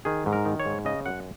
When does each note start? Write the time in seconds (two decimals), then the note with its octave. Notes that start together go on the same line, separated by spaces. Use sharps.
0.05 D#3 G#4
0.26 G#2
0.33 A#4
0.45 D#3
0.60 C#5
0.66 G#2
0.85 C#3 D#5
1.06 F#2 F#5